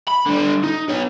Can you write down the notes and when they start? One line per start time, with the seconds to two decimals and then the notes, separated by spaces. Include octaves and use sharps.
0.08 B5
0.26 D3 G3
0.64 D#4
0.90 B3 C#5